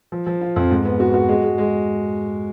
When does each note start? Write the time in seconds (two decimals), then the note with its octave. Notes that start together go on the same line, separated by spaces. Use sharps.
0.12 F3
0.27 F3
0.41 F4
0.56 F2
0.70 G#2
0.85 B3
1.00 F#4
1.14 F#4
1.29 G#3
1.43 G#3
1.58 G#3